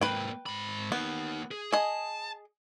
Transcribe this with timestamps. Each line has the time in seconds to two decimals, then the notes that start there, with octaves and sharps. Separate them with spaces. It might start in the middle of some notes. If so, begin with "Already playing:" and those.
0.01 G#2 A#3 B4 G5
0.46 G#2 B5
0.92 A#3 B3 D#4
1.51 G#4
1.72 G#4 D#5 A5